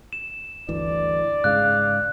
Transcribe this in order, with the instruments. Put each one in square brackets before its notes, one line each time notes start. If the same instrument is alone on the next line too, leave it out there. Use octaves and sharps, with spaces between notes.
[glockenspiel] E7
[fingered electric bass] G1 D2 E3 [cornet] D5
[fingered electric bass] G#2 C#3 G#3 [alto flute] F5 [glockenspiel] F#6